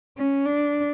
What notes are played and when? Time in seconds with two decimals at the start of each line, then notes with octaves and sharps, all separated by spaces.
0.17 C#4
0.45 D4